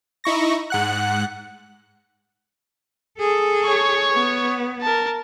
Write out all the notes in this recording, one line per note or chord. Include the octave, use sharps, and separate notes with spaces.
D#4 E4 C#6 A#6
G#2 F#5 F#6
G#4 A4
C#5 C#6
B3
A#4 A5